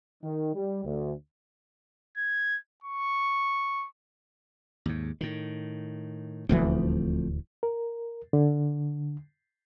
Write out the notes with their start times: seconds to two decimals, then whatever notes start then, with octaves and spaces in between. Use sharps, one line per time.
0.23 D#3
0.55 G3
0.85 D2
2.17 G#6
2.84 C#6
4.86 D#2 G#2
5.21 A2 D#3
6.49 D#1 D2 E3 F3 A3 C4
7.63 A#4
8.33 D3